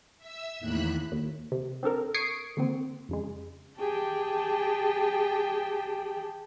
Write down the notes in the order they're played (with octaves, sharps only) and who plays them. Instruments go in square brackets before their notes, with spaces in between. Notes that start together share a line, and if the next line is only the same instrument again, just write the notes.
[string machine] E5 E6
E2 A2 D#3 A#3 B5 F#6
[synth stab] D#2
C3
C4 D4 A4 A#4
C#6 D#6 G#6 C7 D7
D3 A#3 C4
F2 C#3 G#3
[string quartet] G4 G#4 G5 A5